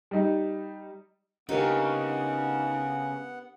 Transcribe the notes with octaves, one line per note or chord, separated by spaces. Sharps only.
G3 D#4
C#2 C#3 B3 D4 D#4 G4 A#4 F#5